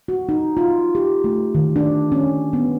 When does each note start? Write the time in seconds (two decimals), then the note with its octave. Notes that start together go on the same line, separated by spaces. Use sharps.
0.08 F#4
0.29 D#4
0.57 F4
0.95 G4
1.24 A3
1.55 D#3
1.76 D4
2.12 C#4
2.53 B3